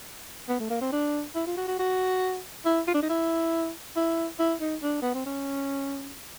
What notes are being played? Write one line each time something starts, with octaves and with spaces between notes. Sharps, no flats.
B3
A3
A#3
C4
D4
E4
F4
F#4
F#4
F#4
E4
F4
D4
D#4
E4
E4
E4
D#4
D4
B3
C4
C#4